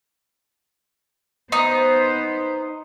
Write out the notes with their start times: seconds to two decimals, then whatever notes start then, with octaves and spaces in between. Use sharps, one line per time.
1.52 B3 D#4 C5